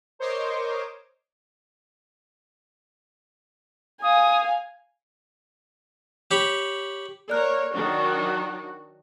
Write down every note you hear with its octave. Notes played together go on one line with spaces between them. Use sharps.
A#4 C5 C#5 D#5 C6 D6
F5 G#5 D#6
G4 C#5 B5 C#6
A#3 A#4 C#5 D5 F#6
D#3 F#3 D4 F#4